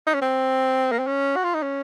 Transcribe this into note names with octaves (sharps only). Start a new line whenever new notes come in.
D#4
C#4
C4
A#3
C4
C#4
F#4
F4
D#4
C#4